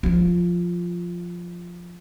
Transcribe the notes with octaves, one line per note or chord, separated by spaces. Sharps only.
F3 F4